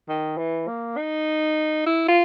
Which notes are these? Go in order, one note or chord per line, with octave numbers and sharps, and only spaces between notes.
D#3
E3
A#3
D#4
E4
F4